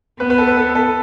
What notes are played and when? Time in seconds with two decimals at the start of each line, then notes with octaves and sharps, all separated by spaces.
0.20 B3 B4
0.30 B4
0.38 A4
0.48 B4
0.57 A4
0.75 A4